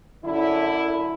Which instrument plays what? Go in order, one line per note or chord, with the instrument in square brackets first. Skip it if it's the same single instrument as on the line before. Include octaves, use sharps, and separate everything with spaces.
[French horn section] F#2 D3 E4